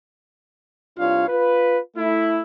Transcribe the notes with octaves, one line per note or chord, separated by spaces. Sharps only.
C2 D4 F4 C#5 F5
F4 B4
A3 E4